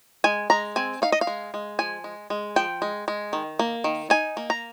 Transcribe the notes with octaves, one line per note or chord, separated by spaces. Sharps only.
G#3 G#5
G#3 A#5
C4 G#5
D#4 F5
D#5
F5
G#3
G#3
F3 G#5
G#3
G#3
F3 G5
G#3
G#3
D#3
A#3
D#3
D#4 G#5
A#3
A#5